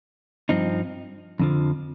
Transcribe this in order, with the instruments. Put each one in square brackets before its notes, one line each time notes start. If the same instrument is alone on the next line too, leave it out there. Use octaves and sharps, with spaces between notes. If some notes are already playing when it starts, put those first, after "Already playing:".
[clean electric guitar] G2 F3 C4 D#4
F2 D3 F3